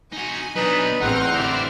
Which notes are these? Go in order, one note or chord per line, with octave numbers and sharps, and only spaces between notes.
D#4 F#4 G#5
F#3 B3 D4 D#4 B4
A1 E2 C4 D#4 F#5 F6
D3 E4 G4 C5 D5